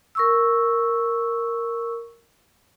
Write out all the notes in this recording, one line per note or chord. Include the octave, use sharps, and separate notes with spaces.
A#4 C#6 E6